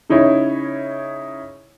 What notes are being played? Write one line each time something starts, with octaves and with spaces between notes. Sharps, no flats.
C#3 D#4 E4 C#5